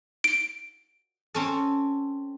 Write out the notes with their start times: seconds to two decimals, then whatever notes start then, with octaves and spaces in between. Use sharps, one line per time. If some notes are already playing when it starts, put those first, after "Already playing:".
0.24 D7
1.35 C4 C#4 A4